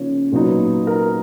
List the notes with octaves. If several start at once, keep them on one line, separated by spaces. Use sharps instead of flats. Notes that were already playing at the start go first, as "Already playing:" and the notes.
Already playing: C#3 F3 A#3 D#4 C#5
A#2 F#3 B3 D#4
A#4